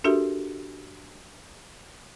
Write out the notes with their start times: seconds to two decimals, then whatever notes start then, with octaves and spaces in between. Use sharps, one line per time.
0.04 D4 F#4 G4 A4 A#4 E5